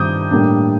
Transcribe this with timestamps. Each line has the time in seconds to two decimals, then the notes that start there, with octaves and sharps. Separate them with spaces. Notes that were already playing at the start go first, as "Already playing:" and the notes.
Already playing: G2 D#3 C4 D6 D#6 G6
0.31 A2 G3 A#3 D4